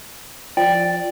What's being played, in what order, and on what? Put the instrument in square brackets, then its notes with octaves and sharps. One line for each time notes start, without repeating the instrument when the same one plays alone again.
[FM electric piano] F3 [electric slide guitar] D5 [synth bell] G5